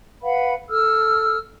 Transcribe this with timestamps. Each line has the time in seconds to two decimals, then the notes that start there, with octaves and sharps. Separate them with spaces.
0.22 B4 F5 F#5 B5
0.70 A4 E6 F6